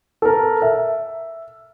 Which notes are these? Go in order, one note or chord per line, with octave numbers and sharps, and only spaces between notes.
A4 A#4
E5